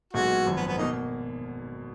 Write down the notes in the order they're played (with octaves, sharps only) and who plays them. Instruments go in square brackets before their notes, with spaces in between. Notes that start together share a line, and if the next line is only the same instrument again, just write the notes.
[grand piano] B1 A#2 G#3 B3 [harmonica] F#4
[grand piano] G#1 F#2 F3
[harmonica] B3
B3
[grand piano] B2 A#3 [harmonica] D#4